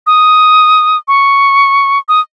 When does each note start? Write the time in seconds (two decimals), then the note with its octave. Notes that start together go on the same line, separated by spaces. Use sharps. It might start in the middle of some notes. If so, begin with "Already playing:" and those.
0.07 D#6
1.08 C#6
2.09 D#6